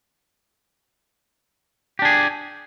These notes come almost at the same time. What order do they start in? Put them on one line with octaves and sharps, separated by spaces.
G4 D4 G#4